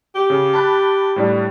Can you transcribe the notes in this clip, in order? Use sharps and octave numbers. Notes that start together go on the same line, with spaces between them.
G4
C#3
A5 B5 F#6
A2 G3 D4